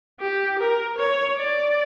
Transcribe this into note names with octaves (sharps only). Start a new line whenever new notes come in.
G4
A#4
C#5
D5